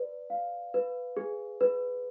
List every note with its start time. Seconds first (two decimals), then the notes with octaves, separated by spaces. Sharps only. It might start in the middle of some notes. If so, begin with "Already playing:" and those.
Already playing: B4 D5
0.30 F5
0.74 B4
1.17 G#4
1.61 B4